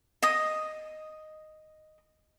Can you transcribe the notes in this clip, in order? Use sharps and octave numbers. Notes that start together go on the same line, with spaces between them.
D#5 D#6